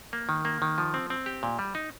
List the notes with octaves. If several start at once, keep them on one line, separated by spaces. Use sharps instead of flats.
A#3
D#3
A#3
D#3
F3
C4
C4
G4
A#2
G3
D#4